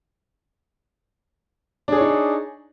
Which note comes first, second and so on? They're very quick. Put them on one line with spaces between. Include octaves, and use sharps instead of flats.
D4 G#4 C#5 D#4